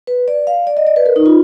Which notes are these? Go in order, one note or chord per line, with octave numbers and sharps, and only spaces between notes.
B4
D5
F5
D5
D#5
D5
B4
A#4
D#4
F4